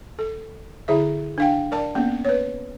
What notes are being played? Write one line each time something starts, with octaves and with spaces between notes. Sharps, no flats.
A4
D3 E4 G#4 E5
D4 F5 G5
A#4 D5 A5
A#3 B3 C#4
B4 C#5